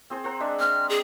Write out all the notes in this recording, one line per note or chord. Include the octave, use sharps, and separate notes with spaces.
C4 G#4 C5
C5 F#5 A#5
G#3 D4 E5
C4 F6
G#4